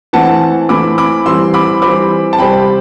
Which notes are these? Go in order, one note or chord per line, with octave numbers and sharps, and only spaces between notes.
E3 A3 C4 F#5 A5
E3 A3 C4 B5 D6
B5 D6
E3 G3 C4 C6 E6
B5 D6
E3 G3 C4 B5 D6
A5
C3 G3 C4 G5 B5